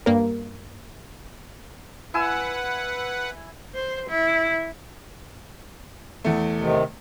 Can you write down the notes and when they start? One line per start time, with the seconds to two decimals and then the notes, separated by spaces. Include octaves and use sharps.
0.06 G2 A#3 A#4
2.14 E4 B4 F#5 G#5 E6
3.74 C5
4.09 E4
6.24 E2 A3
6.59 C3 D#3